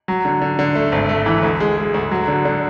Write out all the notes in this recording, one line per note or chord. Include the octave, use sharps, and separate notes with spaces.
F#3
D3
D3
D3
A3
G#1
A3
E3
D2
G#3
G#3
D2
F#3
D3
D3